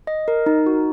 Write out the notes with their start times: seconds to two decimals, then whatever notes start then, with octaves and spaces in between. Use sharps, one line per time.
0.07 D#5
0.28 A#4
0.46 D#4
0.66 F#4